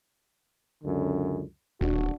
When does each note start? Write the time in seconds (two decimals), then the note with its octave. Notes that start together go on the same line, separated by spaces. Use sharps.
0.84 C#2 F#2 D3
1.81 D#1 D4 F#4